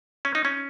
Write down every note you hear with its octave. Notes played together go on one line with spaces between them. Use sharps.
C#4
D#4
C#4